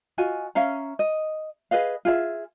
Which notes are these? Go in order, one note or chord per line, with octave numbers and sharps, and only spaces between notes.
F4 F#4 D#5 G#5
C#4 E5 F5 A#5
D#5
G#4 B4 D#5 F5
F4 G#4 E5